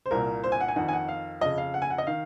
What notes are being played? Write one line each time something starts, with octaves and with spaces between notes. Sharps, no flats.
C5
C2 A#2 A#4
C5
G#5
F#5
G#5
F2 D#3 F#5
G#5
F#5
F5
F2 C#3 D#5
F5
F#5
G#5
F#5
D#5
D#3 F5